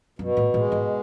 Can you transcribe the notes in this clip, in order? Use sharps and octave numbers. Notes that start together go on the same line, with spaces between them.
F#2 B2
A2
A2 G#3
G#2